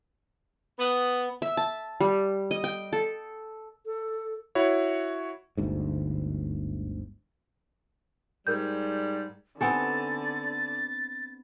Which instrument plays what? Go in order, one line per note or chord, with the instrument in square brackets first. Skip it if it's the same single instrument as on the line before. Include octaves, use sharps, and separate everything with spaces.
[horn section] B3
[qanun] E5
A5
G3
D#5
G5
A4
[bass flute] A4
[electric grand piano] E4 F#4 C#5
[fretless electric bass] G1 D2 G#2
[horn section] G#2 G3 [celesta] A#4 G6
[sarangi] D3 [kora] B3 C4 A4 [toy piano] D#4 G4 G#5 [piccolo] A6